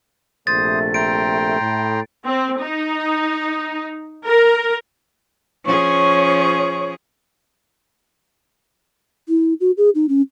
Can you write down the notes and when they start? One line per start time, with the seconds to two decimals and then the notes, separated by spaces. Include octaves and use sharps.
0.47 A#1 C3 A3 C5 D#6 A6
0.94 G5 A#5 C6 D7
1.60 A2
2.25 C4
2.61 D#4
4.26 A#4
5.64 F3 C#4 G#4 C#5 C#6
9.29 E4
9.60 F#4
9.77 G#4
9.95 D#4
10.09 C#4